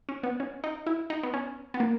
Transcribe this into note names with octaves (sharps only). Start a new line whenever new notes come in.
C#4
B3
C#4
D#4
E4
D#4
B3
C#4
B3
A#3